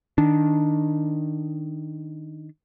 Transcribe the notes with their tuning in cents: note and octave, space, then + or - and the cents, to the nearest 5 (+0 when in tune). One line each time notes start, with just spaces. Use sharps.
D#3 +0 D4 -5